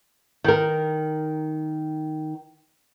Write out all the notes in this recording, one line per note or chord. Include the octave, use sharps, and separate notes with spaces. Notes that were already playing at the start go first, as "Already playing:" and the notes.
D#3 A#4